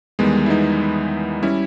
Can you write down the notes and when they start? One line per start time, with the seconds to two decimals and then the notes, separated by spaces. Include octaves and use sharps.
0.19 E2 D#3 G3 G#3 B3
0.46 E4
0.50 B3 D#4
1.43 G3 C#4 E4